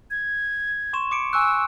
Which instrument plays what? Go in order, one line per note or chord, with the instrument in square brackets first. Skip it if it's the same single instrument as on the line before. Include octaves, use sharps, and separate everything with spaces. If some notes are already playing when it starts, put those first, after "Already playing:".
[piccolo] G#6
[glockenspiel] C6 C#6 E7
D6 C#7 D7
[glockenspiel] G#5 C#6 F#6 [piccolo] E6